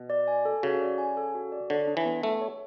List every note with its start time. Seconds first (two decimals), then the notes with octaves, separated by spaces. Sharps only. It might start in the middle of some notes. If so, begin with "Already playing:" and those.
Already playing: B2
0.10 D5
0.28 G#5
0.45 A4
0.63 C#3 F#4
0.81 D5
0.98 G#5
1.17 A4
1.35 F#4
1.52 D5
1.70 D3 C#5
1.87 D4
1.97 E3
2.05 B3
2.23 A3 A4
2.42 C#5